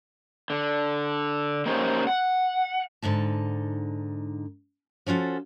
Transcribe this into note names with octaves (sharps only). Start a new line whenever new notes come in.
D3
A#3 C#4 D#4 G4 C5
F#5
G#2 D3 D#4 A5
F3 C#4 F4 F#4 A4